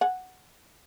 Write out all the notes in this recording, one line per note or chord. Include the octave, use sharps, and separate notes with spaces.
F#5 G#5